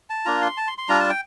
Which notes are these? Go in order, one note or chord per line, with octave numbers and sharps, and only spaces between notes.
A5
A#3 D4 F4 A#5
C6
A5
C6
C6
G3 D4 F4 A#5
A5
G5